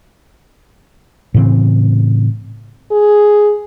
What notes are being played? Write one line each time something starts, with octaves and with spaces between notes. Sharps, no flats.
A2 C#3 E3 C4
G#4